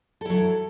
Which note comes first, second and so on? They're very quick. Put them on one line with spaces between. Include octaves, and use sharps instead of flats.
A4 E4 F#3